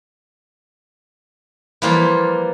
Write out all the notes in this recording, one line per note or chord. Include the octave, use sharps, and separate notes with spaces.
E3 F3 G3 A#3 F4